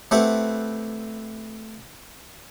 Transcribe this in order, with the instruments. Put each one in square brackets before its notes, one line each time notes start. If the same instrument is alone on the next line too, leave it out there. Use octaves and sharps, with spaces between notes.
[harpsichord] A3 C4 E4 G4 B4 F#5